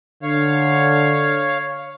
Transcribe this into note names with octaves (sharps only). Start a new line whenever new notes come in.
D3 C#5 F5